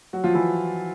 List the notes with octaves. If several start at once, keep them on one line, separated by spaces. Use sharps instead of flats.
F#3 F#4
F3 F4
E3 E4